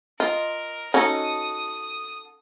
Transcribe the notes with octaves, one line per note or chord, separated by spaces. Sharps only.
F4 A#4 D#5
C#4 D#4 F#4 A4 D#6